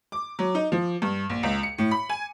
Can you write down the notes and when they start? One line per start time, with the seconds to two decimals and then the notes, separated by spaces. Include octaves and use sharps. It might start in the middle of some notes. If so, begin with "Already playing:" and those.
0.12 D6
0.39 F#3
0.55 D#4
0.72 F3
1.02 G2
1.29 A#1
1.43 C#2
1.63 C#7
1.78 A2
1.91 B5
2.09 G#5